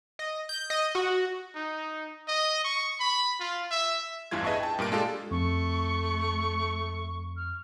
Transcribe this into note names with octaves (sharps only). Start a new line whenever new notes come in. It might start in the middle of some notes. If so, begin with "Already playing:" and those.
D#5
G6
D#5
F#4
D#4
D#5
C#6
B5
F4
E5
A1 E2 G2 E3 F4 G#6
G#4 B4 D#5 E5 A5 C#6
G5 A5
G2 A#2 A#4 D7
G#3 D4 F4 G4 A4
F2 A3 C#6
F6